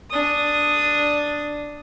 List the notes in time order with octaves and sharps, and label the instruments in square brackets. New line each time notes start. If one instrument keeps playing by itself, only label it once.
[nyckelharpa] D4 D#6